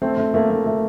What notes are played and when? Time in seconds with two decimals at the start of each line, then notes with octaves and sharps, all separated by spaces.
0.02 A3 C4
0.18 A3
0.34 A3 A#3
0.51 A3
0.66 A3